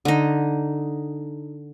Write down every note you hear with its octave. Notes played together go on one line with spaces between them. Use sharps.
D3 D#4